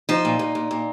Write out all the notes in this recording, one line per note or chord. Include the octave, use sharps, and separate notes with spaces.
F3 D#4
A#2
A#2
A#2
A#2